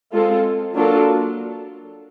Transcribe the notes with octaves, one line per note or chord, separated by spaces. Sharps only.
G#3 C4 F4 A4
F#3 A#3 D4 F4 A4